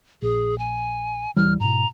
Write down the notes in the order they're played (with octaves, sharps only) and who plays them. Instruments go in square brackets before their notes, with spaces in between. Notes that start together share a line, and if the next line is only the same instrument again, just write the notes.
[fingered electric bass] A#1 [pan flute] G#4
[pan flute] G#5
[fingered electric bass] D1 E3 G3 [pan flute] F6
[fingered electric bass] G#2 B2 [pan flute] A#5